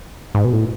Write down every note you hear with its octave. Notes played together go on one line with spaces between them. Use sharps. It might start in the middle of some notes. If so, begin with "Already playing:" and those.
G#2
B2
A2